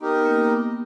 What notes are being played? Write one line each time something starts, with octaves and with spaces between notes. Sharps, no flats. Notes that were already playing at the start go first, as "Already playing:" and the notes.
B3 D#4 G4 A#4 D#5
B3
A#3 C#4
B3